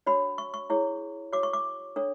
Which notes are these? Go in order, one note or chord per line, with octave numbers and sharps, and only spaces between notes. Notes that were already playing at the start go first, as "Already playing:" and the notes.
D4 F#4 C#5 B5
C#6
C#6
E4 G#4 C#5
F#4 C#5 D6
C#6
D6
D4 A4 C#5